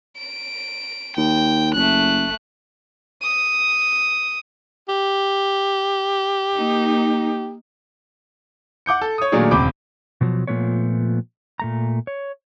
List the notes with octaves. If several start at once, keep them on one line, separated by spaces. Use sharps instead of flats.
D7
D#2 G5
F#1 A3 F#6
D#6
G4
A#3 D#4
F#5 D6 G6 C#7
A4
C#5 D#6
A#2 D#3 F#3 A3 D4 G#4
E1 C#2 C4 B5 D6 G6
B2 F3 F#3
A#2 E3 F3 A3 B3 C#5
A#2 A3 A#5
C#5